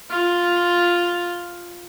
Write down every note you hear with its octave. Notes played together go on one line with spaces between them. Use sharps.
F4